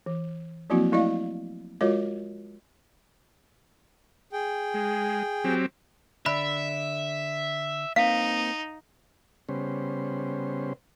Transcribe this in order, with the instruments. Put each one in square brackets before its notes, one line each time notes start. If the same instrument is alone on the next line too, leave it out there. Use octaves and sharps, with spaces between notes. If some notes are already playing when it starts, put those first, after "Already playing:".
[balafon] E3
F3 F#3 A#3 C4 E4 F#4
A3 E4 D5 D#5 F5
G#3 F4 F#4 A#4 C#5 D#5
[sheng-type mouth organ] G#4 G5
[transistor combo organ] G#3
F#3 C4 G4
[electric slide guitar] D3 D5 [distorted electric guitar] E5 [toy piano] B5
[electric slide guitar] A#3 C4 [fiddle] D#4 [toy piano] F5
[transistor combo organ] C#3 G3 B3 C#4 C5